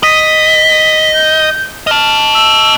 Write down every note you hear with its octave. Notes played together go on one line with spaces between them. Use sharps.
D#5 B6
G6
D#5 A5 F6
E6